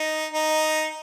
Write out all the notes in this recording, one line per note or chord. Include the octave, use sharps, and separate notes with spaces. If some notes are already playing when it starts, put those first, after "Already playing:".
Already playing: D#4
D#4